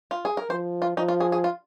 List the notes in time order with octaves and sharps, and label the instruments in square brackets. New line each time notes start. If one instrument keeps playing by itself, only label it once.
[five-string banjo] F4
G#4
A#4
[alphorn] F3 [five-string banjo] C5
[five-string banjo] F4
[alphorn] F3 [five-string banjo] D#4
[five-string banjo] F4
G#4
G#4
F4